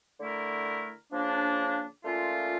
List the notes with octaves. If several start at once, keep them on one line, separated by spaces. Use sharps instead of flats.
D3 A3 E4 A#4
C#3 F3 A#3 D4
A#2 A3 C#4 F4